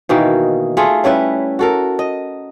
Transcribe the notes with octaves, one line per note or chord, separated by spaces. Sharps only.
B2 D#3 E3 A#3
A3 F4 G#4
G3 C#4 E4 B4
F#4 A4 A#4
D#5